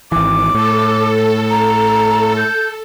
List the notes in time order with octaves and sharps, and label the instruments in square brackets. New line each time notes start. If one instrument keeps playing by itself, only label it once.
[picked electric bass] G#1 E3 [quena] D6
[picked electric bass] A2 [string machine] A4
[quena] A#5
G6